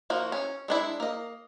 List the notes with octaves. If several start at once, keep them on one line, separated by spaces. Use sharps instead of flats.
F3 A#3 F#4
C#4
G#3 D4 E4
A#3 D#5